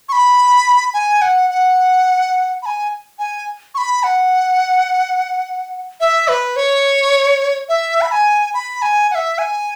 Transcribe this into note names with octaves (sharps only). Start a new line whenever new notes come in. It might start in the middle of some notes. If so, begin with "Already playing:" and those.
C#6
B5
G#5
F#5
F#5
B5
G#5
G#5
C#6
B5
F#5
E5
B4
C#5
E5
B5
G#5
B5
G#5
F#5
E5
G#5